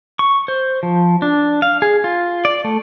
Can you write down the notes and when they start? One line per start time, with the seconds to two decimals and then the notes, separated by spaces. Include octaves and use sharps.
0.19 C#6
0.48 C5
0.83 F3
1.22 D4
1.62 F5
1.82 G#4
2.04 F4
2.45 D5
2.64 A3